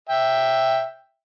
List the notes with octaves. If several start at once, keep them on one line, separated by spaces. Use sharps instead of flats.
E5 G5